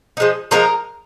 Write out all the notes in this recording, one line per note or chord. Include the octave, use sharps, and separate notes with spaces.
F3 G#3 D#4
F3 G#3 D#4 A#4 A#5